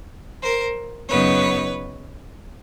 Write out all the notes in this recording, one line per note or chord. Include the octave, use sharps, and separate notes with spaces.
A#4 C5
F#2 C#3 F#3 B3 D#4 B4 C#5